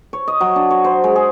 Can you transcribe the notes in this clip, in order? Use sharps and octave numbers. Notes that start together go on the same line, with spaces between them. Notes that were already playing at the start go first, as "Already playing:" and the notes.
C#5
D#5
F#3
D4
C#5
C5
G#3
G#4